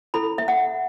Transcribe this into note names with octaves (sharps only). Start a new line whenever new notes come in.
E4 A4 B5
E5
F#5